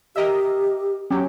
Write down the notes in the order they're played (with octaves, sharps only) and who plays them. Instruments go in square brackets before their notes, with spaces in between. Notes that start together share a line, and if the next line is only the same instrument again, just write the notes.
[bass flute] G4 [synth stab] A#4 D#5 E5
[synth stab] F#3 G4 [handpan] C#4